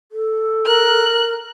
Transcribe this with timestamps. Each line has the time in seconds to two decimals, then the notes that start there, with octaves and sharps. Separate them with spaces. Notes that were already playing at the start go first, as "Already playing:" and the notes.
0.12 A4
0.66 A#4 F#6